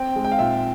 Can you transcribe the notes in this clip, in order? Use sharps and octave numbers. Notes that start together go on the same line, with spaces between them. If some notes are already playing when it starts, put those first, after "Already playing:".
Already playing: C4 G5
G#3
G5
F5
A#2 E5